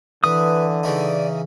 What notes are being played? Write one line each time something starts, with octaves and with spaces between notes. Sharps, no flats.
D3 E3 B4 D#6
C#3 E3 D#4 D5